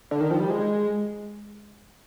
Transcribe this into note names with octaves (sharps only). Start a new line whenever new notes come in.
D3
D#3
F3
G3
G#3